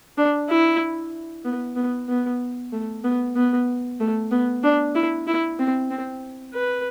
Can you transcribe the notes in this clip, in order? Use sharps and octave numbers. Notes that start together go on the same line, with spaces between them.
D4
E4
B3
B3
B3
A3
B3
B3
A3
B3
D4
E4
E4
C4
C4
B4